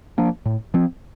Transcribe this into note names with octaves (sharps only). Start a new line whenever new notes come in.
F3 A#3 D4
A2
F3 C4